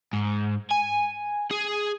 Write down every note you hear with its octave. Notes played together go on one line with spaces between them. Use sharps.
G#2
G#5
G#4